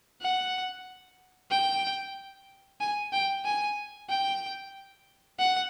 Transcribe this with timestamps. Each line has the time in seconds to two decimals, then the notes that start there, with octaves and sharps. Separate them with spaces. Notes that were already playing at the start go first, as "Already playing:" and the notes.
0.21 F#5
1.51 G5
2.80 G#5
3.13 G5
3.45 G#5
4.09 G5
5.39 F#5